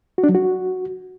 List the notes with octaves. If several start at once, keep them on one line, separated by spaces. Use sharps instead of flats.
F#4
D4
F#3
F#4